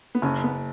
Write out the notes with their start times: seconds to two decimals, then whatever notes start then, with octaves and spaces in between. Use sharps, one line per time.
0.15 B3
0.22 F#1 C#4
0.44 B3